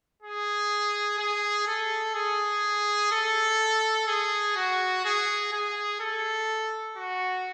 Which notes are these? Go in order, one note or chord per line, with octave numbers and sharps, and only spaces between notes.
G#4
G#4
A4
G#4
A4
G#4
F#4
G#4
G#4
A4
F#4